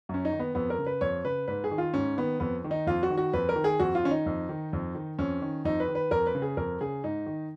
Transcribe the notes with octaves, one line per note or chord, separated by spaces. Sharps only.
F#2 C#4
D#4
D#3
B3
F2 B3
A#4
C#3
B4
F2 C#5
C#3 B4
G#2 B4
G#4
D#3
F4
G#2 C#4
D#3 B3
F2 B3
D#3
D#4
F2 F4
F#4
D#3
F#4
F2 B4
A#4
D#3
G#4
F2 F#4
F4
D#3 C#4
D#4
F2
D#3
F2
D#3
F2 C#4
D#3
F2 D#4
B4
D#3
B4
F2 A#4
B4
C#3
G#4
F2 A#4
C#3 G#4
G#2 D#4
D#3